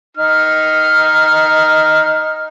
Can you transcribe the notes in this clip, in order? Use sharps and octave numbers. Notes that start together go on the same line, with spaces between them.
D#4 F6